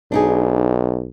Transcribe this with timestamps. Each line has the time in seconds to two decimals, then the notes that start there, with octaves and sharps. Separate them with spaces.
0.12 B1 D4 D#4 G#4